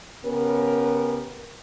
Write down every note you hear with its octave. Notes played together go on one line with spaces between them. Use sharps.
C#3 B3 C#4 G4 A#4